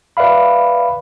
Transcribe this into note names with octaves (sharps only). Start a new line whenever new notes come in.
B4 D5 E5 F5 B5